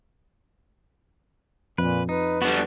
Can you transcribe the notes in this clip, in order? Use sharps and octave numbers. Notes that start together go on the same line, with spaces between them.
F2 A#2 B4
D#4 B4
G3 B3 D4 F#4